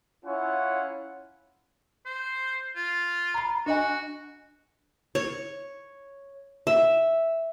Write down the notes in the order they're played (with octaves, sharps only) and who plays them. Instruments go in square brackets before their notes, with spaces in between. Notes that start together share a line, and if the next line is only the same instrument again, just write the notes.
[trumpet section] C#4 E4 F4 C#5 F#5
[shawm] C5
F4
[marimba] A#5 B5
[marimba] D4 D#5 G#5 [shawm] F#4
[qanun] C#5
E5